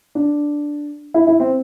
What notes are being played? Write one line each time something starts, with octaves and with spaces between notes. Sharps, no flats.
D4
E4
E4
C4